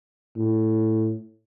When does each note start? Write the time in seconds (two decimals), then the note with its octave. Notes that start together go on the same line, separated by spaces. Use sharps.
0.37 A2